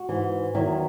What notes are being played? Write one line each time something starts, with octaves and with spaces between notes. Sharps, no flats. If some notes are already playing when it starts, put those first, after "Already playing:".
Already playing: F#4
G#2 E3
E2 D#3 F#3 E4